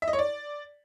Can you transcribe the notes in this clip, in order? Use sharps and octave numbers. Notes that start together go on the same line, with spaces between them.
E5
D#5
C#5
D5